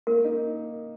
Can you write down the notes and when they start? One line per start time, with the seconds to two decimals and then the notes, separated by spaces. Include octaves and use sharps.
0.07 A#3 A#4
0.24 D#4